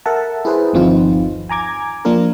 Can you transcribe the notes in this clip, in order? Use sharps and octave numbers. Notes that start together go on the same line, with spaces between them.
A4 A#4 E5 F#5 A5
E4 G#4 B4 C5
G1 D#2 F3 C4 D#4 F4
G#5 A#5 D6 G#6
F3 A#3 D4 F4 A#4